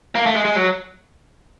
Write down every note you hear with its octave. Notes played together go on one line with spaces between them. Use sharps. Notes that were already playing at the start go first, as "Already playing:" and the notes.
A#3
A3
G#3
G#3
F#3